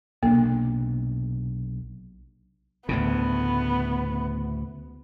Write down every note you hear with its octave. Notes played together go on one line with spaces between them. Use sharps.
B1 C3 A#3 D4
D2 A2 C#3 B3